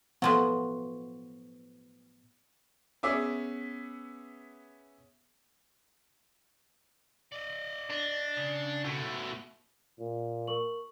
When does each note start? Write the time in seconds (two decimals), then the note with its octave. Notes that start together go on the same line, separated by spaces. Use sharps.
0.22 A2 F3 F#3 B3
3.03 B3 C#4 G#4 E5 D6
7.32 D5 D#5
7.90 D4
8.37 C#3
8.85 B2 A3
9.99 A#2
10.47 A#4 C#6 F#7